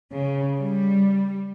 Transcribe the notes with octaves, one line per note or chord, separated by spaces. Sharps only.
C#3
G3